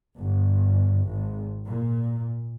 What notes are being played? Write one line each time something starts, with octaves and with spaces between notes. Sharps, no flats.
G1
G#1
A#2